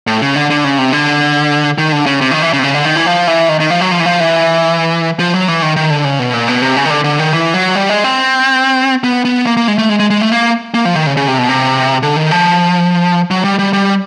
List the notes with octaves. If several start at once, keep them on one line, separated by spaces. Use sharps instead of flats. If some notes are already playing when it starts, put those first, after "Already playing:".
A2
C#3
D3
D3
C#3
C3
D3
D#3
D3
C#3
C3
D#3
E3
C#3
C3
C#3
D3
D#3
E3
F3
E3
D#3
D#3
F3
F#3
F3
E3
F3
E3
F3
F#3
E3
D#3
D#3
D3
C#3
B2
A#2
B2
C3
C#3
D#3
D3
D3
D#3
E3
F#3
G3
G#3
C4
B3
B3
A#3
A#3
G#3
A3
G#3
G#3
G#3
A3
A#3
A#3
F3
D#3
C#3
C#3
C3
B2
C3
D3
D#3
F3
F#3
G3
G3
G3